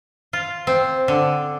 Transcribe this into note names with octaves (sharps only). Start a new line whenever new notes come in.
F4
C4
D3